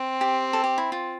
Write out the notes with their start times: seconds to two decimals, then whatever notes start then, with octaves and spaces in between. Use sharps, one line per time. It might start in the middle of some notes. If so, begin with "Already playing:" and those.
Already playing: C4
0.21 G4
0.53 A4
0.64 G4
0.78 E4
0.92 F4